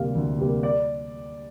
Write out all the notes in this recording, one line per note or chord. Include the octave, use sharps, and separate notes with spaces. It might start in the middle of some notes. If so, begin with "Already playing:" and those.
Already playing: D2 C3 G3 A#3 F5
D2
C3 G3 A#3
D5